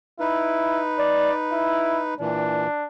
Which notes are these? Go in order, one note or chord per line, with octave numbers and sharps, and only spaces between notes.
D#4 E4 B4
D5
E4
A#2 E3 D4